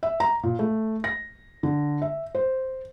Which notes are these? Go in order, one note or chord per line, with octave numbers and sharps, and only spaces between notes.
E5
A#5
A#2
A3
A#6
D3
E5
C5